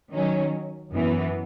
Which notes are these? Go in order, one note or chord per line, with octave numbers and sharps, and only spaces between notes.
D#3 F#3 C#4
F#2 E3 B3